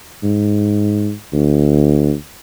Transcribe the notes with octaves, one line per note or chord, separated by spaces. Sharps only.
G#2
D2